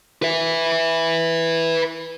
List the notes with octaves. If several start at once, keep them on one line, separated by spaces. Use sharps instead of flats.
B4 E5